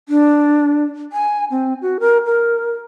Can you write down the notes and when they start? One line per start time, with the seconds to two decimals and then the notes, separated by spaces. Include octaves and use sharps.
0.09 D4
1.12 G#5
1.51 C4
1.82 F#4
2.00 A#4
2.26 A#4